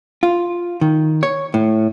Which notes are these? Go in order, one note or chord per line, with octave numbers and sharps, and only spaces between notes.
F4
D#3
C#5
A2